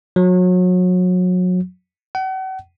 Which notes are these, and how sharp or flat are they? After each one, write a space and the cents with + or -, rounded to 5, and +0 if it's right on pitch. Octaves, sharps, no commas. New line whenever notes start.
F#3 -30
F#5 +40